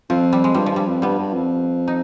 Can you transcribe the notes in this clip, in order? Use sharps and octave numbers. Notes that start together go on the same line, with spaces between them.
F2 F3
G3
G#3
G2 G3
G2 F3
G3
F2
G2 G3 B3
G2
F2
D#4